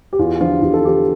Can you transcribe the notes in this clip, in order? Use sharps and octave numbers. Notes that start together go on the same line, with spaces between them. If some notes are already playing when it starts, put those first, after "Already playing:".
G4
E2 F4
D3 F3 F4
E2 G4
A4
D3 F3 G4